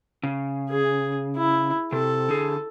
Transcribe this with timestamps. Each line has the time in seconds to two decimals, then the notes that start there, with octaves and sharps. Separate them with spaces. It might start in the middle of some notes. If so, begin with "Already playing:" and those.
0.23 C#3
0.70 G#4
1.36 E4
1.92 C3 A4
2.29 D3 G#4